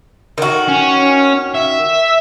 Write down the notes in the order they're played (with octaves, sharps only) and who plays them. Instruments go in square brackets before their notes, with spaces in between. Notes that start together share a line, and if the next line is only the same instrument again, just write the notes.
[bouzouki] D#3 F#4
[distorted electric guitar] C#4
E5